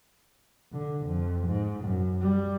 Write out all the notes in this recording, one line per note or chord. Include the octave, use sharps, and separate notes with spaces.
D3
F2
G#2
F#2
G3